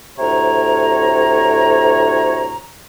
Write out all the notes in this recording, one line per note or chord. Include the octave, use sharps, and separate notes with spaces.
D2 A2 C3 C#5 A#5